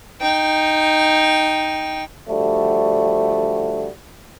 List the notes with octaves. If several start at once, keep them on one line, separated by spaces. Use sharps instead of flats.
D#4 G5
D3 F3 G3 A3 F#4